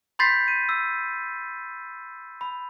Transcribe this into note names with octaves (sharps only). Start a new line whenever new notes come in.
B5 C6 G6 A6 B6 C7
D#7
E6
B5